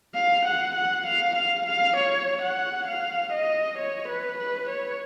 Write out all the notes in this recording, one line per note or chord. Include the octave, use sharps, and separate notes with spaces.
F5
F#5
F#5
F5
F5
F5
C#5
F#5
F5
D#5
C#5
B4
B4
C#5